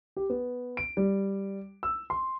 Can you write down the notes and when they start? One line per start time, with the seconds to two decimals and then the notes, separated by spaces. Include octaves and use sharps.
0.17 G4
0.30 B3
0.77 D7
0.97 G3
1.83 E6
2.10 C6